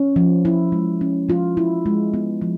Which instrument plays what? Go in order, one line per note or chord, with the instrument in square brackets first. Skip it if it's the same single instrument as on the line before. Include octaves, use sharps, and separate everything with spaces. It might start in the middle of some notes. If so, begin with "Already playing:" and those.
Already playing: [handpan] C#4
F3
E4
G#3
C#4
F3 F4
E4
G#3
B3
F3